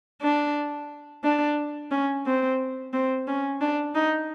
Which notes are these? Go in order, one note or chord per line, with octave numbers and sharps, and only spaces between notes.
D4
D4
C#4
C4
C4
C#4
D4
D#4